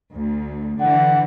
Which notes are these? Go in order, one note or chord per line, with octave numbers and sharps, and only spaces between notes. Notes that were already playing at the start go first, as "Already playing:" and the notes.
D2
D3 E3 F#5